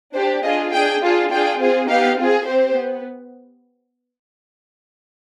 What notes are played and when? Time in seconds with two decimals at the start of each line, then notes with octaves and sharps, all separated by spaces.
0.13 D4 G4 C5
0.43 D4 F4 G#4 D#5
0.72 D4 G#4 G5
1.02 D4 F4 G#4
1.31 D4 F4 G#4 G5
1.60 C4 F4 G#4
1.89 B3 D#4 G4 F5
2.18 C4 F4 G#4
2.47 C4 G4 C5
2.76 B3